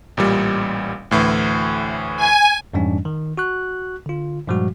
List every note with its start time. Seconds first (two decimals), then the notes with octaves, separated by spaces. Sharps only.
0.17 A1 A#2 G3
1.11 D2 A2 E3
2.17 G#5
2.74 F2 G#2 E3 G3 C#4 D4
3.05 D#3
3.38 F#4 C#6 F#6
4.06 D3 F4
4.47 G2 A#2 F3 G3 G#3 F#4